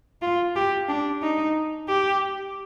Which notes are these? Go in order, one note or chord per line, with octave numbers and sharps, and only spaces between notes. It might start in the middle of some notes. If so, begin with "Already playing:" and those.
F4
G4
D4
D#4
G4